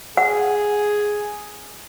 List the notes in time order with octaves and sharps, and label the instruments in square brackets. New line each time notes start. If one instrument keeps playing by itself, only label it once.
[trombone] G#4 [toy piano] F#5